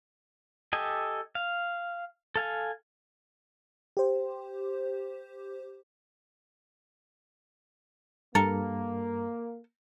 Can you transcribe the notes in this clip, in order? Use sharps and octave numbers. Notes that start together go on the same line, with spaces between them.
G4 A4 D#5 G#5
F5
A4 F5 G#5
G4 C5
G2 A#3 A4 A#4